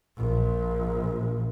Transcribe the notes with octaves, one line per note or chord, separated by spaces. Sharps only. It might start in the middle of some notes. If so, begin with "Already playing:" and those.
A#1